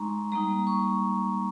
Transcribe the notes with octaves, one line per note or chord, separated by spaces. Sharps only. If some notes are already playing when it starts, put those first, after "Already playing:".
Already playing: G#3 D#4 A#5 C6 C#6
G3 A#3 D#4 A#5
C#6